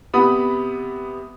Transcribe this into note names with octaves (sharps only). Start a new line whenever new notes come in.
C3 B3 B5 D#6